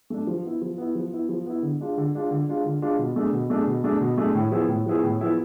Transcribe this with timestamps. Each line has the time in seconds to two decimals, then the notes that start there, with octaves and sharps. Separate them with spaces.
0.10 A3 D4
0.27 F3
0.44 B3 E4
0.62 F3
0.78 B3 E4
0.95 F3
1.12 B3 E4
1.29 F3
1.46 B3 E4
1.62 D3
1.80 G#3 D4 F4
1.97 D3
2.14 G#3 D4 F4
2.31 D3
2.48 G#3 D4 F4
2.65 D3
2.82 G#3 D4 F4
2.99 B2
3.16 A3 D4 G#4
3.33 B2
3.50 A3 D4 G#4
3.67 B2
3.84 A3 D4 G#4
4.01 B2
4.18 A3 D4 G#4
4.35 A2
4.52 F3 B3 E4 G#4
4.69 A2
4.86 F3 B3 E4 G#4
5.03 A2
5.19 F3 B3 E4 G#4